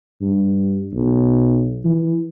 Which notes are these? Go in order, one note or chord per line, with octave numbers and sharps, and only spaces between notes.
G2
B1
E3